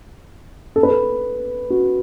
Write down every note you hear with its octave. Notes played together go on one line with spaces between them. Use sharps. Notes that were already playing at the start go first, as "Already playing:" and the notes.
A4
B4
A4
F#4